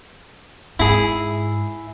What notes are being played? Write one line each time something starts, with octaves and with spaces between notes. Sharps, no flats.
G#2 E4 G#4